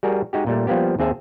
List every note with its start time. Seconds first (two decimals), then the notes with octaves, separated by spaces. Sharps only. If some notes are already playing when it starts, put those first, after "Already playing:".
0.03 G3 F#4 G#4 A#4
0.33 G#3 D#4 F#4 G4
0.47 A#2 G3 A3
0.67 F3 G3 A#3 B3 G4
0.99 D#2 C4 G#4 E5 A5